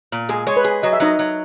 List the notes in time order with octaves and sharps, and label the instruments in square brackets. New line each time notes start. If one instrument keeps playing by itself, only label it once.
[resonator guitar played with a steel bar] A#2
[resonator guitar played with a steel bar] G#3 [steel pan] G#4
[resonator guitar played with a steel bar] G#3 [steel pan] C#5
[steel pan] B4
[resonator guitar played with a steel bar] G#4
[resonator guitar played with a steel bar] F#3 [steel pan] D#5
[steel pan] E5
[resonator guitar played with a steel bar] F#3 [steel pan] D#4 D#5
[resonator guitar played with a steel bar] F#3